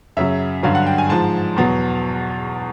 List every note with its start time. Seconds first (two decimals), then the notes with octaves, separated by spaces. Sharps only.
0.17 F#2 C#3 F#3 E5
0.63 G2 D3 F#3 F5
0.75 F#5
0.86 G5
0.98 G#5
1.09 G#2 F3 A5
1.56 E2 B2 F#3